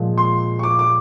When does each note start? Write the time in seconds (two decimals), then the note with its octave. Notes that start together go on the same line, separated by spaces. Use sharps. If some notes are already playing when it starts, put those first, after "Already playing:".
Already playing: A#2 F3 G#3
0.18 C6
0.59 C#6
0.63 D6
0.79 D6